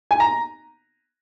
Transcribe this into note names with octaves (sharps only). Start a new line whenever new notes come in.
G#5
A#5